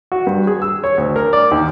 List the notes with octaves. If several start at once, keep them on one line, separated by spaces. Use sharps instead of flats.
F#4
G2
G#4
E6
C#5
D2
A#4
D5
D#2